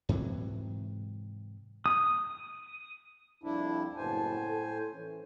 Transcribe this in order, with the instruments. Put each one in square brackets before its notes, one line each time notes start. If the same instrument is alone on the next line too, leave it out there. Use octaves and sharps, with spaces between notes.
[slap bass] G#2 C3 E3 F#3
[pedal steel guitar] D#6
[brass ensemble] C2 F2 [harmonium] D4 E4
[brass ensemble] F#1 B3 A5 [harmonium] A2 C5 G#5
[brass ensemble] A4
E3 C#4